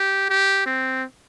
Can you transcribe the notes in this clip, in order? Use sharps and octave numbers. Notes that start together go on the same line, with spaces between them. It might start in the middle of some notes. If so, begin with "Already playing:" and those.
Already playing: G4
G4
C4